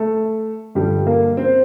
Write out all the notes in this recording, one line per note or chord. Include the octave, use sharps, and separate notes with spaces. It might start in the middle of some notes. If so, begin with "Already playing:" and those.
Already playing: A3 A4
G2 D3 F3 G3 G4
A#3 A#4
C4 C5